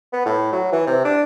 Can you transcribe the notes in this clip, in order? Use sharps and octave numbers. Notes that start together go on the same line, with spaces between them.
B3
A2
F#3
E3
C3
D4